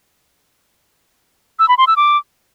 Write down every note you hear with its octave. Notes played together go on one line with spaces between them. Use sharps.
E6
B5
C6
E6
D6